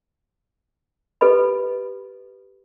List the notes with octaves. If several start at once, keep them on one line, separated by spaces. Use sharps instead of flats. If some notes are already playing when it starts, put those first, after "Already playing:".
G4 A4 B4 D#5 B5